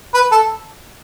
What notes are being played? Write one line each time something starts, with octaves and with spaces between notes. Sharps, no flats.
B4
A4